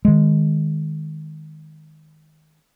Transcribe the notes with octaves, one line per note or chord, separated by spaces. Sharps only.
D#3 G#3